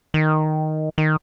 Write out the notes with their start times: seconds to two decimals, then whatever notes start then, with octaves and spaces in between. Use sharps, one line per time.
0.14 D#3
0.98 D#3